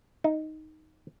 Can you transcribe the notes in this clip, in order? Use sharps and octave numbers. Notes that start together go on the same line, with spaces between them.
D#4